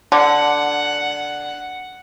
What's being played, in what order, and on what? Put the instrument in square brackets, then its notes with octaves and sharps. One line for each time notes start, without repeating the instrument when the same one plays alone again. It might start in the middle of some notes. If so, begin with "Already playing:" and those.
[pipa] D3 [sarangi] F#5